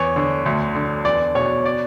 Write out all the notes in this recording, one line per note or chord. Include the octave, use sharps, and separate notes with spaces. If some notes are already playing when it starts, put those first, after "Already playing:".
Already playing: E2 C#5
D3
D2
D3
E2 D5
B2 C#5
D5